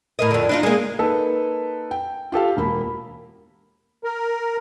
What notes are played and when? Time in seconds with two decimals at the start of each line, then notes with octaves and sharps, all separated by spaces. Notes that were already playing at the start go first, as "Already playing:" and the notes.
0.19 A2 A#4 D#5
0.31 F2 D3
0.49 D4 D#4 F4
0.63 G#3 A#3
0.99 A#3 D#4 A4 B4
1.91 G5
2.32 F4 G4 A4 F5
2.57 E1 A#3 B5
4.04 A#4